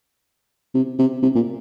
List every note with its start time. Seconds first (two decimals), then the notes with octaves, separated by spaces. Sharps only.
0.74 C3
0.99 C3
1.23 C3
1.35 A#2